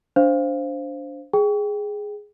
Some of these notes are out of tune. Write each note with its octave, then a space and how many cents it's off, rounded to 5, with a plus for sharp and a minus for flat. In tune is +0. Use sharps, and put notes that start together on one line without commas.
D4 -20 C5 +0 F5 -10
G#4 +0 G5 +0